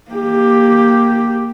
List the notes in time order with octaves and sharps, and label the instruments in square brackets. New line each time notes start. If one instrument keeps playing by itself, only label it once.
[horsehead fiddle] A#3 G4